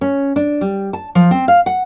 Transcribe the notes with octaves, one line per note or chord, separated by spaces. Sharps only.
C#4
D4
G3
A5
F3
C4
F5
F#5